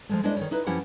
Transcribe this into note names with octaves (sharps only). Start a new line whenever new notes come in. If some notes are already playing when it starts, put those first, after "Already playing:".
F3 G#3 A3
G#3 D4 E4 C5 D5 D#5
D#3 E3 C#5
D#4 E4 B4
F#2 F3 C#4 E4 G4 F#5